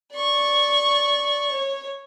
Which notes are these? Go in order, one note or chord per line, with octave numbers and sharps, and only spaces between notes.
D5 C#6
C#5